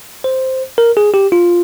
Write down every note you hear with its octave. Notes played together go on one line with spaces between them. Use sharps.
C5
A#4
G#4
G4
F4